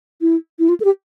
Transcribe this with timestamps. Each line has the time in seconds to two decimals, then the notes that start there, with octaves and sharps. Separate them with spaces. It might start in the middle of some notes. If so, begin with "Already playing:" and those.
0.21 E4
0.59 E4
0.69 F4
0.80 A4
0.85 G4